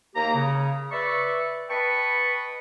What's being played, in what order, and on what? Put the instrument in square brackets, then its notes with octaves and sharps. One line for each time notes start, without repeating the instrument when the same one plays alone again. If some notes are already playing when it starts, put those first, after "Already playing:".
[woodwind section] D#2 A#3 G4 A#5
C#3
B4 D5 E5 B5 C#6
B4 D#5 G5 A5 B5 C#6